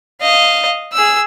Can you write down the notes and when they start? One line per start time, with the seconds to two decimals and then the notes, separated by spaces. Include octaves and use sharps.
0.21 D#5 F5
0.93 G#4 E6